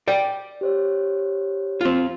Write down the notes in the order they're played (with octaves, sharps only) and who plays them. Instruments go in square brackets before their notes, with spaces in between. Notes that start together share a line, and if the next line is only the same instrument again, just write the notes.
[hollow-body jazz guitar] D5 G5
[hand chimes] G4 C5 C#5
[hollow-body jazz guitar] C4 F4